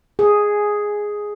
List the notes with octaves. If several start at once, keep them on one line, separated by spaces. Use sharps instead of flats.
G#4